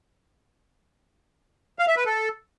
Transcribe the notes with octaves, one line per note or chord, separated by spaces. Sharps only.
F5
E5
B4
A4